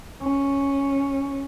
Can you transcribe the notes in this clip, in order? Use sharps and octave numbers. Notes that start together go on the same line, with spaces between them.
C#4